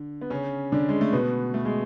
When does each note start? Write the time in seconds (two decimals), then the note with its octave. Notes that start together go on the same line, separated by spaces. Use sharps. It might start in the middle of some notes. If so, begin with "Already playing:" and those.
Already playing: D3
0.21 B3
0.30 C#3 C#4
0.72 D3 D4
0.89 G#3
1.01 A3
1.13 B2 B3
1.54 A3
1.65 G#3